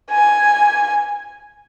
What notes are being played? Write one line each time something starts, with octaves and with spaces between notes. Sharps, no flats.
G#5